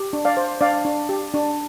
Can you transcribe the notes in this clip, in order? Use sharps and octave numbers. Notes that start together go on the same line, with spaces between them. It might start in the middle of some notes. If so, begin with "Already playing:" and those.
Already playing: G4
D4
D5 F5
C5
D4 D5 F5
D4
G4
D4